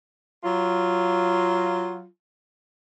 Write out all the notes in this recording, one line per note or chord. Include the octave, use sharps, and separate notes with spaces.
F#3 F4